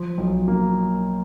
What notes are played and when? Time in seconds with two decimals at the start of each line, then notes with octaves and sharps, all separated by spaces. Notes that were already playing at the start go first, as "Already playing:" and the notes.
Already playing: F3
0.18 B1
0.48 A#3